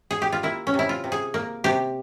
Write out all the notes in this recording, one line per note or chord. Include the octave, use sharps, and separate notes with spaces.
G#4
G4
F4
A#3 E4
C#4
C3
E4
F4
C3
G#4
A#3
C3 G4